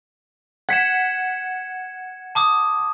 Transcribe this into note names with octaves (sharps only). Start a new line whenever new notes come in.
F#5 G#6 B6 C#7 E7
A5 D6 D#6